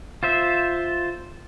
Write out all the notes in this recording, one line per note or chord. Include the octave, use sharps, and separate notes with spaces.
F4 C5 E5